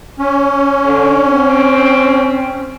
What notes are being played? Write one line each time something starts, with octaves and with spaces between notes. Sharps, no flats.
C#4
D3
C4